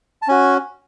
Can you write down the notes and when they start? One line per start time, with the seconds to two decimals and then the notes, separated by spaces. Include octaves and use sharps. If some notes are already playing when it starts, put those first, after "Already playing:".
0.22 A5
0.28 C#4 F#4 G#5